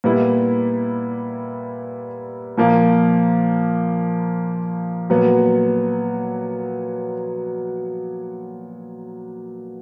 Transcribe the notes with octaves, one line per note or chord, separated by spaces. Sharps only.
A#2 G3 B3 E4
A#2 F3 A#3
A#2 F#3 B3